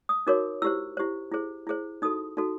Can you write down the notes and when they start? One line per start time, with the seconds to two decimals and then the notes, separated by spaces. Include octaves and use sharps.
0.09 D#6
0.27 D#4 F#4 A#4 C#5 D6
0.62 E4 G4 C5 E6
0.97 E4 G4 C5
1.32 E4 G#4 C5
1.67 E4 G#4 C5
2.02 D#4 F#4 A4 D#6
2.37 D#4 F#4 A4